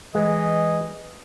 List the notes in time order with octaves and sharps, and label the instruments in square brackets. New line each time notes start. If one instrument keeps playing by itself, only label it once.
[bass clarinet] E3 [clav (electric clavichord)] G#3 [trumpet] D#5